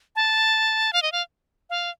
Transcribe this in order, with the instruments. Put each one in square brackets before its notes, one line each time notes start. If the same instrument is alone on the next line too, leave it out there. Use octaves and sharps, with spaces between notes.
[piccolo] A5
F5
D#5
F5
F5